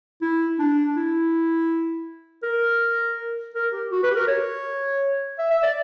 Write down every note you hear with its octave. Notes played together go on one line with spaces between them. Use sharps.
E4
D4
E4
A#4
A#4
G4
F#4
B4
G4
A#4
C#5
E5
E5
D5